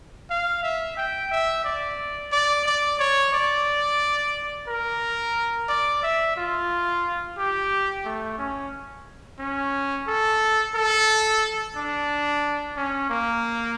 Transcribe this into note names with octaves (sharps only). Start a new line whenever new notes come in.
F5
E5
G5
E5
D5
D5
D5
C#5
D5
A#4
D5
E5
F4
G4
A3
C#4
C#4
A4
A4
D4
C#4
A#3